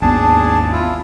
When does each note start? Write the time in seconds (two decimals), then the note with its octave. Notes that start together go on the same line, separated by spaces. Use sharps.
0.02 G#1 D#2 B3 D4 G#4 A5
0.73 E4 F4